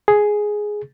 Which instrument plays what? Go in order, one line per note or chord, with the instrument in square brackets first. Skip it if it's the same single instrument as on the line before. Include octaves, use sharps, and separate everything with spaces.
[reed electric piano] G#4